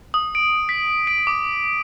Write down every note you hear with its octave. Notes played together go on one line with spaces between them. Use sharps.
D#6
D7
B6
D7
D6